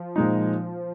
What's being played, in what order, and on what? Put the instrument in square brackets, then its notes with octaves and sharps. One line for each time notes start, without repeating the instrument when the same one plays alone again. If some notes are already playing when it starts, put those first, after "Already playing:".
Already playing: [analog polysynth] F3
[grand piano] A#2 G#3 D#4